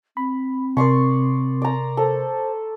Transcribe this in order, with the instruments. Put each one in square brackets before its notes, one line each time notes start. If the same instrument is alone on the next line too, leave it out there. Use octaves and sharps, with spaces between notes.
[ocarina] C4 [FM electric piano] B5
[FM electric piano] C3 A#4 [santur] D5 C6 C#6
[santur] D5 A#5
[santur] A4 [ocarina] C5